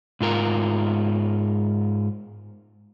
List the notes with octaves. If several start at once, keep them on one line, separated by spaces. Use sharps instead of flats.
G#2 F4 A#4